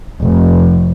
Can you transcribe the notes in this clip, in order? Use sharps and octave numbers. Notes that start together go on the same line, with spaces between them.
F1